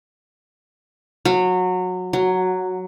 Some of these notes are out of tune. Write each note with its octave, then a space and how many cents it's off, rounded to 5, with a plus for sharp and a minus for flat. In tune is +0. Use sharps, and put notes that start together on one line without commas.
F#3 -20
F#3 +0